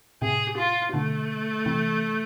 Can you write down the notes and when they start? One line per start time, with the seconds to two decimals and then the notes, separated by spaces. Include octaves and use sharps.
0.22 A2 C3 G#4
0.58 F4
0.94 B2 D3 A3
1.66 C3 E3